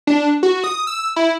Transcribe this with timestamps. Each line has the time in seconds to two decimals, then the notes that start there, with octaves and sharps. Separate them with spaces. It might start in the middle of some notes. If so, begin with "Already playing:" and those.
0.07 D4
0.43 F#4
0.64 D#6
0.87 E6
1.16 E4